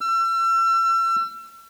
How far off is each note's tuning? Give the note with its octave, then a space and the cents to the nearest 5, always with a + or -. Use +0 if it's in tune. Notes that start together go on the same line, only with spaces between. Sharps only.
E6 +35